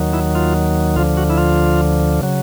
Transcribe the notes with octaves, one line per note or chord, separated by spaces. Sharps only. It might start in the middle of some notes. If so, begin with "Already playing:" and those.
Already playing: D#2 D#3 F#3
E4
F4
D2 D3 F3 F4
F#4
E4
F4
C#3 F#3